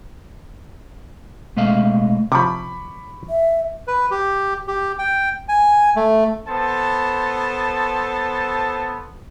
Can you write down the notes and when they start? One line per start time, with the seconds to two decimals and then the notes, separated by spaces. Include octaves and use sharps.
1.56 B2 G#3 A3 D#5 F5
2.32 C3 F3 B5 C#6 D6
3.30 E5
3.87 B4
4.11 G4
4.68 G4
4.99 G5
5.48 G#5
5.96 A3
6.47 B3 A4 C5 A5